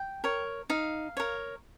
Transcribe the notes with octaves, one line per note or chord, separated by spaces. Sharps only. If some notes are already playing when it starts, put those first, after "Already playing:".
Already playing: G5
A#4 C#5
D#4 F5
A#4 C#5